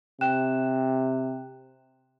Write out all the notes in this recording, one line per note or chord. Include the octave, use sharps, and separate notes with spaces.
C3 G5 F#6 E7